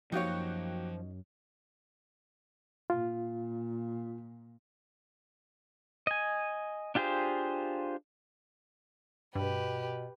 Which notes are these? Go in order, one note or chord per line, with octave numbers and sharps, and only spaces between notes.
F#2 F3 A#3 D#4 F#4 G4 C#5
A#2 F4
D#5 G#5
D4 F4 G4 G#4 C5
G2 B2 G4 B4